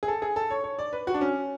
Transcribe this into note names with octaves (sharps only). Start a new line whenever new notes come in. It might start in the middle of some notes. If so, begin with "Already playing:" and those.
G#4
A4
G#4
A4
C#5
C#5
D5
B4
F#4
D4
C#4